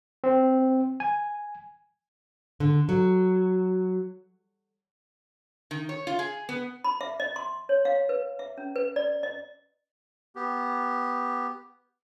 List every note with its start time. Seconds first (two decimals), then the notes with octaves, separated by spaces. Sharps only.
0.24 C4
1.00 G#5
2.60 D3
2.89 F#3
5.71 D#3
5.89 C#5
6.07 F4
6.19 G#4
6.49 B3
6.84 B5
7.01 E5
7.20 D#5
7.36 C6
7.69 C#5
7.85 F5
8.09 B4
8.39 E5
8.58 C#4
8.76 B4
8.96 D5
9.23 D#5
10.36 B3 G4